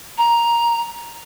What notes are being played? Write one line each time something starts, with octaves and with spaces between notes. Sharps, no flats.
A#5